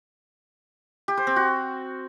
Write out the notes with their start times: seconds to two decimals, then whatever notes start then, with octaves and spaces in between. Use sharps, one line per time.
1.08 G4
1.17 C5
1.27 C4
1.36 F#4